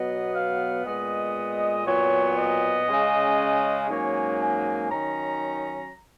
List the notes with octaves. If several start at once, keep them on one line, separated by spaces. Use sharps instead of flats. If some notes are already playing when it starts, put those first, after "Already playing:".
Already playing: B2 F#3 B3 D#5
F5
A#2 G#3 B3 D#5
A#2 F#3 B3 C#5
D#5
C#3 G#3 C#4
G#2 F#3 A#3 C#4 C#5
G#5
D#3 F#3 C#4 A#5